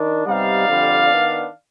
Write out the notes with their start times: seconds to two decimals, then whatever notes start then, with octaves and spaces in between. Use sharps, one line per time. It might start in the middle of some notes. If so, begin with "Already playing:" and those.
Already playing: D#3 D4
0.26 C3 G3 B3 D#4 D5 F5
0.67 F2 D3 G3
1.08 D#3 B3 D4